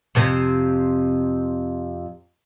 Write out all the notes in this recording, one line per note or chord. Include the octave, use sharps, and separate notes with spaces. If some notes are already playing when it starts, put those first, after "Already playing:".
F2 C3 C4